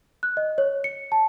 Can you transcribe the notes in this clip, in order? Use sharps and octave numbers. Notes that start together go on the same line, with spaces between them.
F#6
D#5
C#5
C#7
A5